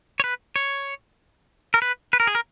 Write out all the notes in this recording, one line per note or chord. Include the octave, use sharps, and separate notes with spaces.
C#5
B4
C#5
A#4
B4
B4
A#4
G#4
A#4